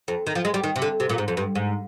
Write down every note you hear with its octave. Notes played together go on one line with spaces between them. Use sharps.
F2
D#3
F3
G#3
G3
D#3
C3
D3
C3
A#2
G#2
F2
G2
G#2